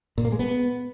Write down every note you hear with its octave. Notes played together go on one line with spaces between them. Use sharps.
A#2
A#3
G#3
B3